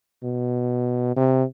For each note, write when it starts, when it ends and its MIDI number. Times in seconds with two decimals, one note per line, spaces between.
0.23 1.14 47
1.16 1.43 48